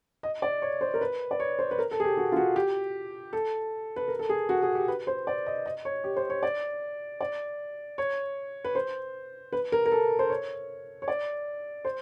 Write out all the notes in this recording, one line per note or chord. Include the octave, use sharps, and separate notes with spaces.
D#5
D5
C#5
C5
A#4
B4
D5
C#5
C5
B4
A#4
A4
G#4
G4
F#4
F4
F#4
G4
A4
B4
A#4
A4
G#4
F#4
G#4
G4
B4
C5
D5
D#5
D#5
C#5
G4
C5
C#5
D5
D5
C#5
B4
C5
B4
A#4
A#4
A4
C5
C#5
C#5
D5
C5